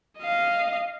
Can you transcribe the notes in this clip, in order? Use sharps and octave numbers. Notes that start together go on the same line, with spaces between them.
D#5 F5